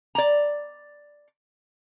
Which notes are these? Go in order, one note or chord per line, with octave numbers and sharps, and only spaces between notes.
D5 A#5